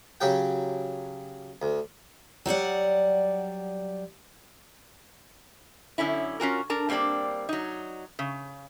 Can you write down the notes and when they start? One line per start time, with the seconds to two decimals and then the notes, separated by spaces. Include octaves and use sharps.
0.21 C#3 F#3 G4 G5
1.62 D2
2.46 F#3 G3 D5 F#5
5.98 F#2 D3 C#4 E4
6.40 C#4 F4 F#4 A#4
6.70 D4 A#4 A5
6.89 G3 A#3 C4 D4 D5
7.49 F#3 D#4
8.19 C#3